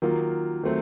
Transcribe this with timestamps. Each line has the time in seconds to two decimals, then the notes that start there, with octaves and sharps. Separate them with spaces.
0.02 D#3 F#3 A#3 F4
0.63 D#3 F#3 A3 C4